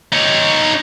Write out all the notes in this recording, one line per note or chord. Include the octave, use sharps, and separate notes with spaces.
D#4 C#5